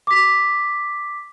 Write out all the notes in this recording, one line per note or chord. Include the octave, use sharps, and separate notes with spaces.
D6 B6